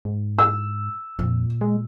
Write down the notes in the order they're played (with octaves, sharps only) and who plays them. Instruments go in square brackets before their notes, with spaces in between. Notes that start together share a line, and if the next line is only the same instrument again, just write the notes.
[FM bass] G#2
[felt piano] E6
[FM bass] F2 [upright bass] A#2
[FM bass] G#3